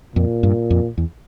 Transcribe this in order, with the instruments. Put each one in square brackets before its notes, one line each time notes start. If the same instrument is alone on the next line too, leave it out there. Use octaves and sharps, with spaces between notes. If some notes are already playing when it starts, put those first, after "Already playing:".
[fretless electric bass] F2 [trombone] A#2
[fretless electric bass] G2
F2
E2